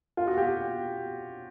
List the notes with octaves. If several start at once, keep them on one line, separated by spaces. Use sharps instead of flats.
F4
F#4
G4